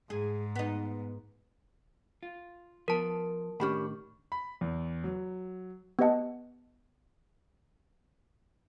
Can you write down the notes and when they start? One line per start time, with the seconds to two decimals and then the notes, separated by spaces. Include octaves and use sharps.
0.10 G#2 G#4
0.55 B3 D#4
2.23 F4
2.88 F3 B3 A#4 A5
3.60 A2 D#3 C#4 D4 G4 B5
4.32 B5
4.61 E2
5.04 F#3
5.99 B3 G4 B4 D#5 F#5 A5